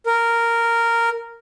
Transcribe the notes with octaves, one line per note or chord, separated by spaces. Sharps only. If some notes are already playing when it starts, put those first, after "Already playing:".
A#4